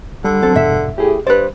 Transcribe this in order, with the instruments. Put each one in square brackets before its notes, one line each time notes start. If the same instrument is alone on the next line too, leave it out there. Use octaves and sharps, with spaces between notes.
[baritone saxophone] D3 [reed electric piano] G3
[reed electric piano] F#3 C4 [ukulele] A4
[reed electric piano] E2 G2 B2 [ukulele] E5
[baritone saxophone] A2 [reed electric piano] G4 G#4
[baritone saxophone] G2 [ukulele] B4 D5 [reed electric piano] C5